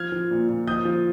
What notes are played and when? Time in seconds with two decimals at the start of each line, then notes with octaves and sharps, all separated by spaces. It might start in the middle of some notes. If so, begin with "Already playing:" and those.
Already playing: F3 F6 G#6
0.12 F3
0.31 A#2
0.49 A#2
0.67 F3 D#6 G6
0.85 F3